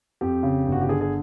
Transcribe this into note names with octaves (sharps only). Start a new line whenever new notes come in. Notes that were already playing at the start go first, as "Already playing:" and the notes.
F2 G4
C#3
G1
F#4
G4
D3 G#4
G#4